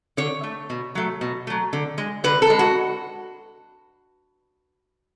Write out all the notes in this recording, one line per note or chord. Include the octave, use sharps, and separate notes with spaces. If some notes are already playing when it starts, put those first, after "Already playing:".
D3 C#5
A3
B2
F#3 A3
B2
F#3 A3
D3
G#3
D3 B4
A4
G#3
F#4